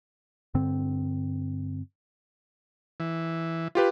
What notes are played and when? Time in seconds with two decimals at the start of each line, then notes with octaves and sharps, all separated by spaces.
0.54 G2 D3 C4
3.00 E3
3.75 F4 G4 B4